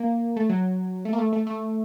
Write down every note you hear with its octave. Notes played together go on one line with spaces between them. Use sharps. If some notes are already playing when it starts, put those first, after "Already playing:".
Already playing: A#3
A3
F#3
A3
A#3
A3
A3
A3